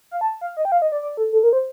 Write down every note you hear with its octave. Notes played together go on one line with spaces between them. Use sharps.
F5
A5
F5
D#5
G5
F5
D#5
D5
D5
A4
A4
A#4
C5